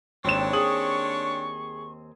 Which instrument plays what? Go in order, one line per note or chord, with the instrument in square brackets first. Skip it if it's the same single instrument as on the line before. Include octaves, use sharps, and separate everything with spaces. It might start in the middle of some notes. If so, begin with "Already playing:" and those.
[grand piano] G#1 E7 [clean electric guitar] D#2 C4 [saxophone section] D4 C#5
[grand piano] G#4 D#6 F#7 [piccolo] C#6